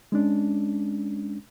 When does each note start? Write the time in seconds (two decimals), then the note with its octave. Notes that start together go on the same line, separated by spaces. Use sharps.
0.12 G#3 C#4 D4